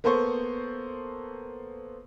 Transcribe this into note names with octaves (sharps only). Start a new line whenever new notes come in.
A#3 B3 A4 C5 C#6